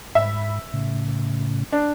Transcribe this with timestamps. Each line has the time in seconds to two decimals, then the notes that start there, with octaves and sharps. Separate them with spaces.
0.15 G#2 E5 B5
0.73 A2 C#3
1.72 D4